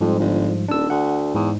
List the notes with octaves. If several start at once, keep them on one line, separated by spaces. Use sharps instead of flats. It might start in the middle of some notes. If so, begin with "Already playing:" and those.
F2 G#2 F3 G3
G1
D#1 D4 E6
D2 F#5
E2 G#2